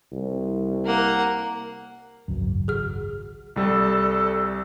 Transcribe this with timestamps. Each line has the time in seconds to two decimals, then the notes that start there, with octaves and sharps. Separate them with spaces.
0.12 C2
0.85 A#3 F#5
2.28 G#1 C#2 F#2 C#3 F#3
2.68 F#4 G#4 F6
3.56 C2 G3 A4